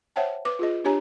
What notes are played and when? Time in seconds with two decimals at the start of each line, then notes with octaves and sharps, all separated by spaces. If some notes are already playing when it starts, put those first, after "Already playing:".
0.16 C5 C#5 E5 F#5 G5 A5
0.45 B4 D6
0.59 F4 G#4 D#5
0.84 D4 G4 C#5 G#5 A#5